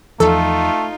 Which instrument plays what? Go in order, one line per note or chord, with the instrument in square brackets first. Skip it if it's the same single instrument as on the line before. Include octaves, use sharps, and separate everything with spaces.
[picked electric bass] E2 F3 [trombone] A3 [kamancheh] D#4 F4 [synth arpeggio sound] A4